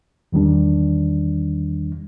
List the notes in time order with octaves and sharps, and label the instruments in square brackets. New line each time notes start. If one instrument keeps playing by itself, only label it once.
[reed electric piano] E2 D#3 G3 D4